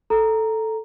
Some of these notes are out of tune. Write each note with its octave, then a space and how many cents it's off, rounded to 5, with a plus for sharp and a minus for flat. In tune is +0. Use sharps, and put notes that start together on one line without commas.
A4 +0 A#5 +0